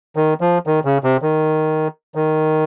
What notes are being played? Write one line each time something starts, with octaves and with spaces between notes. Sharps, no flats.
D#3
F3
D#3
C#3
C3
D#3
D#3